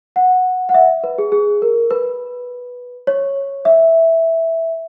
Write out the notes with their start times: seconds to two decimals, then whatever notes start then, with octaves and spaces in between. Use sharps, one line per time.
0.16 F#5
0.69 F#5
0.74 E5
1.04 B4
1.18 G#4
1.32 G#4
1.62 A#4
1.91 B4
3.07 C#5
3.65 E5